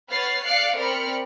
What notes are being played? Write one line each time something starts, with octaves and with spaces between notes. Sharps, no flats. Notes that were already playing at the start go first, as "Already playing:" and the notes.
B4 C#5 F#5 F6 A6 C7
D5 F5 F6 F#6 C7 C#7
C4 A#4 D5 B5 F6 C#7